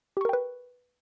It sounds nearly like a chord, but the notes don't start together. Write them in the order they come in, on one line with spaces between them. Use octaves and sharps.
G4 C#6 A#4 G5 B4